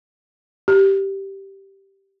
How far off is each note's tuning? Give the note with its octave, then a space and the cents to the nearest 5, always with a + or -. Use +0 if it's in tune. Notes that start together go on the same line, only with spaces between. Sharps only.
G4 -10